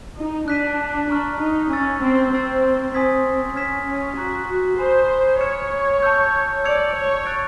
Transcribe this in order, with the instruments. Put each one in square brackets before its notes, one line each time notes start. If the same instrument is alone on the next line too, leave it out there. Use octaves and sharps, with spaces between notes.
[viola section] D#4
[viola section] D4 [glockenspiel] F#6 B6 D#7
[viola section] D4 [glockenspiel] A#5 C#6 F6
[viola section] D#4
[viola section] C#4 [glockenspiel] C#6 E6 A6
[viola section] C4
[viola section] C4 [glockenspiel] C6 E6 A6
[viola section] C4 [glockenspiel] G#5 C6 D#6 G#6 B6
[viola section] C#4 [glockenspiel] F6 G#6 B6 E7
[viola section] C#4
[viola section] F#4 [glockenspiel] A#5 C#6 F#6 B6
[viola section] C5 [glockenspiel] G#5 B5 D#6
[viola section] C#5 [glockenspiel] F6 G#6 C#7 E7
[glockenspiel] A5 C#6 E6 G6
[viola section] D5 [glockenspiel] E6 G#6 C#7 F7
[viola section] C#5
[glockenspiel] C#6 F#6 A6 D7